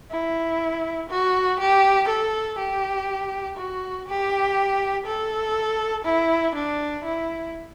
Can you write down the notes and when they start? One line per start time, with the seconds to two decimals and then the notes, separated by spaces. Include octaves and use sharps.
0.11 E4
1.09 F#4
1.60 G4
2.09 A4
2.58 G4
3.57 F#4
4.08 G4
5.06 A4
6.05 E4
6.55 D4
7.04 E4